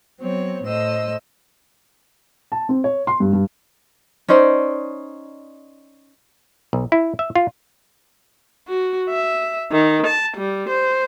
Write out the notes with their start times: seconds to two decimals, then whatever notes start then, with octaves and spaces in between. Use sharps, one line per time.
0.21 F#3 B3 C4 C#5
0.64 A2 A3 C5 D#5 E6
2.52 A5
2.69 C4
2.84 C#5
3.07 C6
3.20 G2
3.33 G2
4.28 C#4 D#4 C5 D5
6.73 B1
6.92 E4
7.19 E5
7.35 F4
8.68 F#4
9.10 E5
9.72 D#3
10.07 A5
10.37 G3
10.69 C5